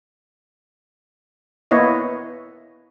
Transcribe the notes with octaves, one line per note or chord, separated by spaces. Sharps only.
A#3 B3 E4 C#5 D#5